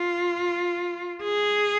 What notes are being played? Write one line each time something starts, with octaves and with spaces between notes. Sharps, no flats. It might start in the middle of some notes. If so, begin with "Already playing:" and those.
Already playing: F4
G#4